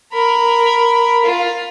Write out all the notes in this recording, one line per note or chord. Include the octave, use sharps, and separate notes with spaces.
A#4 B5
F4